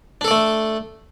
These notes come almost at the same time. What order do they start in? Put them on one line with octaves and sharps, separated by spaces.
D4 A4 D5 A3